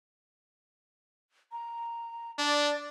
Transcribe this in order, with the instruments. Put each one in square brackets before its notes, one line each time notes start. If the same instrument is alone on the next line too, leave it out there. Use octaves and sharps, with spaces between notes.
[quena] A#5
[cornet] D4 [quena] D5